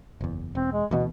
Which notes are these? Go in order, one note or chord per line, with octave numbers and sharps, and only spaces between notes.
F#1 E2
E1 C4
G#3
D2 B2 E3 B3